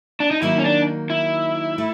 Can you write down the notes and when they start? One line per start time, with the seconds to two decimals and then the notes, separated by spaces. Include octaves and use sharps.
0.20 D4
0.31 D#4
0.42 D#3 F#3 A#3 D#4 E4
0.59 C#4
0.65 D4
1.10 E4
1.78 A3